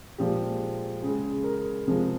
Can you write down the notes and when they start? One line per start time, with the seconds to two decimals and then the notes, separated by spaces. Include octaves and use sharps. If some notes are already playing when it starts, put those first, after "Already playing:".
0.18 A#2 F3 G#3 G4
1.03 C#3 G#3 G#4
1.44 A#4
1.87 C3 F3 G#3